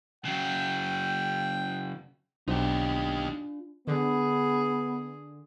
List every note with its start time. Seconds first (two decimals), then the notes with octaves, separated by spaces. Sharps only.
0.25 C#3 F#3 G5
2.48 B1 D4 D#4 F4 G4 C5
3.87 D3 B3 G#4